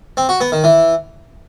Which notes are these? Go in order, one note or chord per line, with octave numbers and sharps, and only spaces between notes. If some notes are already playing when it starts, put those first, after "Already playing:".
C4
F#4
B3
D#3
E3